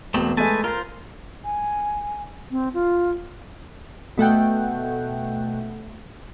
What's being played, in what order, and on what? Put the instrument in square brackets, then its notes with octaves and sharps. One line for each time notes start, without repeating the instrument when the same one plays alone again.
[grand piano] E1 [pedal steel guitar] A3 B3 C4
[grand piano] G#3 A3 [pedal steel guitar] B4 G#5 A5
[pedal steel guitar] F4 C5 [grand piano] A#4
[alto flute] G#5
C4
F4
[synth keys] B2 A3 F#5 G5